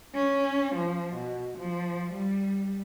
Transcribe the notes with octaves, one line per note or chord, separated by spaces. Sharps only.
C#4
F3
B2
F3
G3